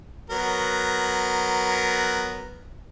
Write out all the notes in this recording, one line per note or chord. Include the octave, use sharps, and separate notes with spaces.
F#3 B3 A#4